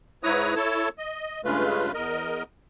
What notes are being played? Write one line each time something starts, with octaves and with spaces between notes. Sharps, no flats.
G#2 E4 B4 C#5 A#5 D#6
E4 A4 C#5 A5
D#5
G2 C#3 G#3 A3 F4 B4
E2 A#4 D#5